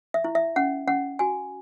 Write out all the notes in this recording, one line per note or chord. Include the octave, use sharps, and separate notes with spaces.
E5
E4
E5
C#4 F#5
C#4 F#5
F#4 G#5